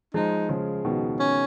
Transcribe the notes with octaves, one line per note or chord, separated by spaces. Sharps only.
F3 G#3 D#4
C#3 F3
B2 D#3
C#4